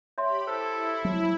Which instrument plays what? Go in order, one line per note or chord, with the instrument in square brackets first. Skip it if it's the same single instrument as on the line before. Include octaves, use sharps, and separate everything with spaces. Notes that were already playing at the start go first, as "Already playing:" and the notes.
[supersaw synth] G4 B5 [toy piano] C#5 E5 C6
[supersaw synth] E4 [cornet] A4 [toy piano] C5
[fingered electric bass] F#3